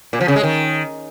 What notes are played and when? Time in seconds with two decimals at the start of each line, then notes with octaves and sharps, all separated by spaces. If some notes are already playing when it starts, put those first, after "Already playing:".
0.13 A#2
0.21 F3
0.28 C#3
0.36 G#3
0.43 D#3